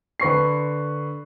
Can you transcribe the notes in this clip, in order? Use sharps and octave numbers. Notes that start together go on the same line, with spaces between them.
D3 B4 C#6 C7